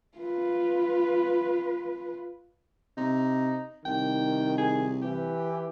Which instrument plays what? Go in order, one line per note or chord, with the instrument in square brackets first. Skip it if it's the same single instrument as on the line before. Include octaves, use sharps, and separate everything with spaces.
[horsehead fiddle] F4 B4
[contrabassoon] C3 [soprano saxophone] D#4
[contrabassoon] C2 [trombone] D#3 [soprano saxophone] G5
[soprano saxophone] G#4
[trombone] E3 [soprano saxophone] G4